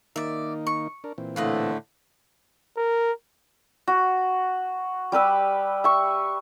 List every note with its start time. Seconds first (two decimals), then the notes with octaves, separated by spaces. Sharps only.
0.16 D#3 A#3 D#4 D5 E5
0.67 C#6
1.04 D4 A#4
1.18 A#2 E3 C4
1.36 A2 D3 A3 F4 B4 D#5
2.77 A#4
3.87 F#4
5.12 G3 G4 B4 E6
5.84 E5 C#6